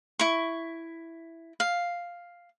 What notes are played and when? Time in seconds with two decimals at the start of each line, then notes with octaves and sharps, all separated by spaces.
0.19 E4 C#6
1.60 F5